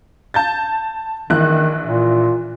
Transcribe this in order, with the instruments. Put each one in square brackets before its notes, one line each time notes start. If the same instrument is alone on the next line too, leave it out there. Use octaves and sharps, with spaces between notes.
[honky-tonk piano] A5 G6 A6
[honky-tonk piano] A#1 E3 F#6 [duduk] D#3
[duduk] A#2